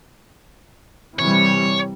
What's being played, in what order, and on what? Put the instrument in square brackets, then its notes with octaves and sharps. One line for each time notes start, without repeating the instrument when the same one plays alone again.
[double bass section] C3 E3 G3 [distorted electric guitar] C#5